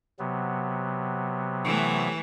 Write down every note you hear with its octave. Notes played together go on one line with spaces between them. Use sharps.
C3 F#3 B3
E3 A3